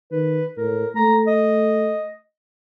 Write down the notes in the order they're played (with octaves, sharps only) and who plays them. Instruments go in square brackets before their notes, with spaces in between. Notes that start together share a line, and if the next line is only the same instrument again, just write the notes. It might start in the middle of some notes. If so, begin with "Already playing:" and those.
[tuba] D#3 [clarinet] B4
[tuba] A2 [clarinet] A#4
[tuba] A3 [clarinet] A#5
[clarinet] D#5